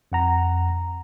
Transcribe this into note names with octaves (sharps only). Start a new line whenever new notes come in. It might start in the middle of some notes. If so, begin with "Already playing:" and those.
F2 F#5 A#5